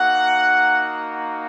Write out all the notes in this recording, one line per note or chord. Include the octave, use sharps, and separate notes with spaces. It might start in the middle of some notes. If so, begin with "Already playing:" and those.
Already playing: A#3 D#4 F#4 F#5